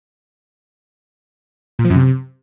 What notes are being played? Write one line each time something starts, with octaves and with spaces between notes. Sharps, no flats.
A#2
F3
F#2
C3